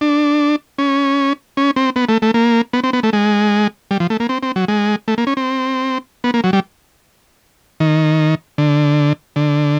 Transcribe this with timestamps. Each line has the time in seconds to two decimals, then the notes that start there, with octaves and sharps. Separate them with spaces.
0.01 D4
0.78 C#4
1.57 C#4
1.76 C4
1.96 B3
2.09 A3
2.22 A3
2.34 A#3
2.73 B3
2.84 C4
2.93 B3
3.03 A3
3.13 G#3
3.91 G3
4.00 F3
4.10 A3
4.20 A#3
4.29 C4
4.43 C4
4.56 F#3
4.68 G#3
5.08 A3
5.18 A#3
5.27 C#4
5.37 C4
6.24 B3
6.34 A#3
6.44 F#3
6.53 G3
7.80 D#3
8.58 D3
9.36 D3